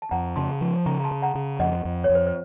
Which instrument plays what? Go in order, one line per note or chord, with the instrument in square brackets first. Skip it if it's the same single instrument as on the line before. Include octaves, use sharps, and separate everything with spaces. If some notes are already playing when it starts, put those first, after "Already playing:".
[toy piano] A5
[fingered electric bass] F2 [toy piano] F#5 A#5
[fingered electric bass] C#3 [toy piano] A5 C6
[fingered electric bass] F3
[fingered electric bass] C#3 [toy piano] A#5 C#6
[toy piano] A#5
A5 C6
[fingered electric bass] C#3
[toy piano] F#5 A#5
[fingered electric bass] C#3
[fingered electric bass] F2 [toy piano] D#5 F#5
[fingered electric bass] F2
[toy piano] C#5
[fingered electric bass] F2
[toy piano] C5
C5